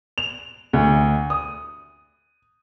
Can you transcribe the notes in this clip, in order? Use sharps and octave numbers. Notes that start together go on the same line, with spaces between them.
F7
D2
D#6